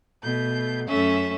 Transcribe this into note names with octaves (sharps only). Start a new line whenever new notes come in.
B2 A3 G6
F#2 A3 C#4 E5